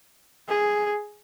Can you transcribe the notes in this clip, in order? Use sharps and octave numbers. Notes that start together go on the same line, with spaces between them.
G#4